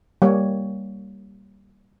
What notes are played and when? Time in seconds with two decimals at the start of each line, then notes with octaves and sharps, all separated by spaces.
0.22 G3 A#3 C#5